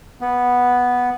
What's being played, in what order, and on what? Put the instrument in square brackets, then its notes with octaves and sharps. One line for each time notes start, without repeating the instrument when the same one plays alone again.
[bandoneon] B3